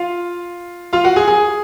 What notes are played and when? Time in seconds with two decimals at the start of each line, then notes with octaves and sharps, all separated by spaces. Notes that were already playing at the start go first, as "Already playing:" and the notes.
Already playing: F4 F5
0.93 F4 F5
1.04 F#4 F#5
1.16 G#4 G#5
1.28 G#4 G#5